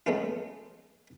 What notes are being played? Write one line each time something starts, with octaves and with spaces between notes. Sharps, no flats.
G#3 A3 B3 C#4 F4